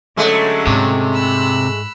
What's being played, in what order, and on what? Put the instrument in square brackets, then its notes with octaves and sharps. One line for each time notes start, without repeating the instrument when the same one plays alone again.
[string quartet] D3 F#3 C#4 [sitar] G#3 A3
[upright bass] G#2 [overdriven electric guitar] C3
[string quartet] B5 E6 F#6